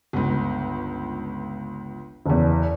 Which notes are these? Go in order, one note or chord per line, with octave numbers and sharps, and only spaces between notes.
G1 C#2
F#1 E2